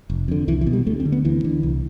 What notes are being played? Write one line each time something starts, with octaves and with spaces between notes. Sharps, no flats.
F1
F2 D3
C2 E3
E3
B2
G3
D2 A3
C4
D3
B3
D2 E3
D3
C2